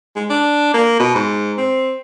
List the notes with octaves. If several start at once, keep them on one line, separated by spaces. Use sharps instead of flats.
G#3
D4
A#3
B2
G#2
C4